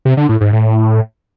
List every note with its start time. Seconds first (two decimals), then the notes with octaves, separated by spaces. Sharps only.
0.05 C3
0.17 D3
0.29 A2
0.41 G#2
0.53 A2